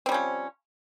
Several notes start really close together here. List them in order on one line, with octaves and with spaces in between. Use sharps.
C4 G3 C#4 F3